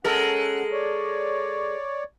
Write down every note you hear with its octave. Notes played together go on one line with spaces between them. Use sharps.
G#3 C#4 A4 A#4 F#5
C#5 D5